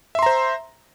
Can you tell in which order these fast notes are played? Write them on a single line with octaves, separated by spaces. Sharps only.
E5 C6 A#5 C5